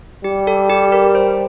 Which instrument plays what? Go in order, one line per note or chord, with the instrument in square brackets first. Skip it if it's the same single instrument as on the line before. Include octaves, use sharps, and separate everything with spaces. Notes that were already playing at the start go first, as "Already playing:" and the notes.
[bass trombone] G3 [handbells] G4
[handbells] A4
G4
A#4
C5